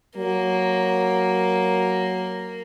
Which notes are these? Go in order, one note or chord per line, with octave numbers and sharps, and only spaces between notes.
F#3 A#3